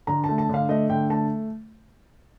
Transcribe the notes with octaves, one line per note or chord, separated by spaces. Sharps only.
D3 A#5
A5
A3
A5
D3 F5
A3 D#5
D3 G5
A3 A5